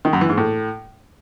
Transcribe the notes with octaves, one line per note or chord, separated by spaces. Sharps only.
D#3
F#2
E3
G#2
A2